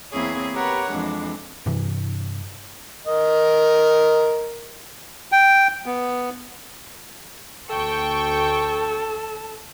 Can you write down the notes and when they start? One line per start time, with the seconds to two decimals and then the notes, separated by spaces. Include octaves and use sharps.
0.11 E2 A#3 C4 E4 G#4 C#5
0.53 G4 A#4 B4 C#5 F#5
0.89 F2 E3 G#3 D4
1.66 G2 C3 E3
3.06 A#4 D#5
5.32 G5
5.86 B3
7.70 D2 A4 G5 C#6